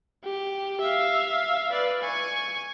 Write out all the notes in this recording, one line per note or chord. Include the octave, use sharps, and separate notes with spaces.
G4
E5 F5
B4 D5
G#5 C#6